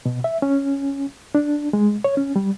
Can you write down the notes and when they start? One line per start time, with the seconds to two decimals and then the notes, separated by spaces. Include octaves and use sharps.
0.06 B2
0.24 E5
0.42 C#4
1.35 D4
1.73 G#3
2.04 C#5
2.17 C#4
2.36 G3